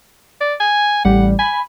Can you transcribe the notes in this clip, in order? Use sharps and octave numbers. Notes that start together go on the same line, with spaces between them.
D5
G#5
A1 G3 F#5
G#5 B5